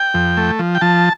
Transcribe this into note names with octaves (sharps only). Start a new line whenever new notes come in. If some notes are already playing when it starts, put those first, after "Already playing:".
Already playing: G5
F2
A3
F3
G5
F3 A5